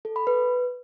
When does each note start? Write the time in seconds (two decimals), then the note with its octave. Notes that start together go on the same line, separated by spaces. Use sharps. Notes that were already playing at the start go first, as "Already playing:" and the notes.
0.05 A4
0.16 B5
0.27 B4